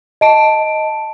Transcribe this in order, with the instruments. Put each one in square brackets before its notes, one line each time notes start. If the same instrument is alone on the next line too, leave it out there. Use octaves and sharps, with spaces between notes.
[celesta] D#5 A5 D7